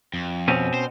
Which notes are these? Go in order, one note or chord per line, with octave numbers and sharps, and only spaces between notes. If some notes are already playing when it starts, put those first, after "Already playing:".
F2
B2 C4 C#4
C5